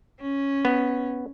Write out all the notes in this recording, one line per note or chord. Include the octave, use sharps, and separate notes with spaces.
C#4
B3